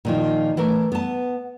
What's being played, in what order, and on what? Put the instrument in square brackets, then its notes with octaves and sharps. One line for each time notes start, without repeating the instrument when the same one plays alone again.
[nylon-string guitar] A#2 D#3 F3
E3 A3 A#4
B3 A5